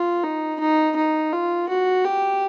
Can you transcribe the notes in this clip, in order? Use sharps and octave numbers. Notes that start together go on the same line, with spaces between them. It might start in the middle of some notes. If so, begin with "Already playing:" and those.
Already playing: F4
D#4
D#4
D#4
F4
F#4
G4